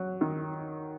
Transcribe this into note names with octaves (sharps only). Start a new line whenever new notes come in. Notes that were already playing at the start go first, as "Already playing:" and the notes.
Already playing: F#3
D#3